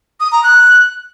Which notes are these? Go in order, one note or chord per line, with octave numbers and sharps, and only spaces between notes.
D#6
A#5
F#6